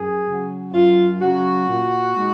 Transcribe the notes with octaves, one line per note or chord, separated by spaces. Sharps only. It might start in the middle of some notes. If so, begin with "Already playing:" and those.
Already playing: F#2 G#4
C#3 F#3 C#4
F#2 F4
C#3 F#3 C#4 F#4
A#2
G#3 D#4